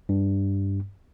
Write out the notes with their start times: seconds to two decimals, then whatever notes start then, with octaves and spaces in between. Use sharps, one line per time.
0.09 G2